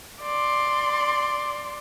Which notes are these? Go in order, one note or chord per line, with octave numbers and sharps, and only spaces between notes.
D5 C6